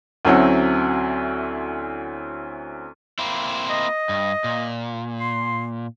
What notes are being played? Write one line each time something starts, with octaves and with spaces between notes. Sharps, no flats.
D2 F#3 C4 C#4 E4 F#5
A#3 C4 E4
D#5
G2
A#2
C6